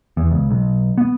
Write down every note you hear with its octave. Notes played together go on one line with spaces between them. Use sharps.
E2
C#2
B1
B3